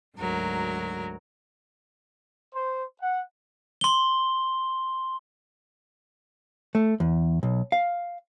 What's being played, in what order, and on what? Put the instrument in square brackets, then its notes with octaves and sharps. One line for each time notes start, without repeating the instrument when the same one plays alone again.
[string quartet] D2 G#2 F#3 A#4
[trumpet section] C5
F#5
[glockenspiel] C6 G7
[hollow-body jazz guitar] A3
E2
B1
F5